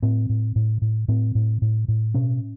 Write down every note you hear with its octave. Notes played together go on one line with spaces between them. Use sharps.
A2 C4
A2
A2
A2
A2 C4
A2
A2
A2
B2 C#4